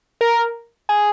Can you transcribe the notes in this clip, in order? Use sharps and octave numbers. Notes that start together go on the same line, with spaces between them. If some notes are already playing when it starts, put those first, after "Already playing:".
A#4
G#4